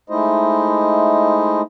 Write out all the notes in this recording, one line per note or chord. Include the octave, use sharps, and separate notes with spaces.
G#3 A3 D#4 E4 C5 D#5